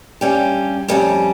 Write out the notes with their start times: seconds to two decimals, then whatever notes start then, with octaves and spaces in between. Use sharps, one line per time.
0.21 G2 G3 C#4 G4
0.88 F2 C3 G3 C#4